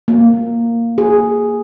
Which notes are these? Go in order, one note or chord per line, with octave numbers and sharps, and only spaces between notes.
A#3
G#4